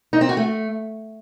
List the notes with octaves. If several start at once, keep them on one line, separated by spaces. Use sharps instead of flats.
D#4
C4
F#4
A3